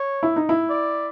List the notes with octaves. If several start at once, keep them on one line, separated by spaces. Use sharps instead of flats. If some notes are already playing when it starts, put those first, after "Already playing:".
Already playing: C#5
E4
D#4
E4
D5